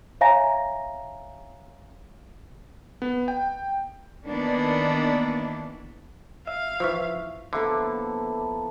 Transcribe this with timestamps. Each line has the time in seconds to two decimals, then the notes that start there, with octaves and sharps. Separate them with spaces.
0.21 C#5 E5 F5 G#5 A#5 A#6
3.02 B3
3.28 G5
4.26 D#3 E3 A#3 B3 D4
6.47 E5 F5
6.80 E3 F3 E5 C#6 E6
7.53 D3 F3 A#3 B3 E4 A4